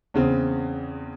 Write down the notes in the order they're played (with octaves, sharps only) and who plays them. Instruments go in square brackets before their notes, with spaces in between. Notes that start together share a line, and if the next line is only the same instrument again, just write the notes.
[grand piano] E2 C#3 C4